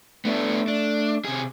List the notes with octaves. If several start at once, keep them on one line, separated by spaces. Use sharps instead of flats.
A3 B3 D4
D4
C3 G#4